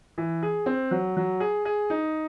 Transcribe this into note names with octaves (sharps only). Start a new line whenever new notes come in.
E3
G#4
C4
F#3
F#3
G#4
G#4
D#4